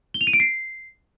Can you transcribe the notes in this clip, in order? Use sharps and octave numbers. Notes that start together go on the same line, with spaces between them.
G7
F7
D#7
D7
C7